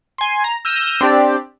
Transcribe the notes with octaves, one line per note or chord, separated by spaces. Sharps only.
G#5 C6
A#5
E6 F6 G6 A#6 D#7 E7
C4 D4 G4 D5